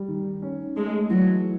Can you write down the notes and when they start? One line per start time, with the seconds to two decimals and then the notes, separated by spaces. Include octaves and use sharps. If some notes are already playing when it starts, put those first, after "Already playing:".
Already playing: G3
0.08 D#3
0.42 C#4
0.76 G#3 A3
1.10 E3 F#3